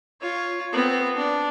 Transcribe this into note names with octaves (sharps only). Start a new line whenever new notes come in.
F4 C#5
B3 C4
D4